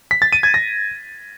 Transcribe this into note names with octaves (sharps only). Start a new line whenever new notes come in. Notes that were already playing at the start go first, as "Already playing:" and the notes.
B6
A6
D#7
G#6
A#6